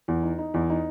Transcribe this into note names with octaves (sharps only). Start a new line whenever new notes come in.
E2
D#4
D#4
E2
D#4